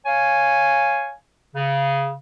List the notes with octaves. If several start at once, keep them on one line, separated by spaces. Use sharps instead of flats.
C#5 F5 G#5
C#3